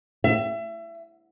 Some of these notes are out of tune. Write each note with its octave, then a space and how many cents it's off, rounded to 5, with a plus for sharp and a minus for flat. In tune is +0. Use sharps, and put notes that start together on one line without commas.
E5 +30